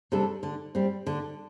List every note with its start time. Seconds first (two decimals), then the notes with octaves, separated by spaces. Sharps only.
0.12 C3 G3 D4 A4
0.43 D3
0.75 G3 C4
1.07 D3